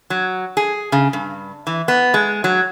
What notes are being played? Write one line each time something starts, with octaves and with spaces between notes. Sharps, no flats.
F#3
G#4
C#3
G2
E3
B3
G#3
F#3